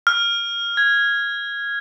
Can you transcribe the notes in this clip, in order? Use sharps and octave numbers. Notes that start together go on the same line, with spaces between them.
F6
G#6